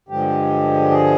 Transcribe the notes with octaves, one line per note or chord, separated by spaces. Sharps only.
G2 D3 F3 G#3 G4
G#4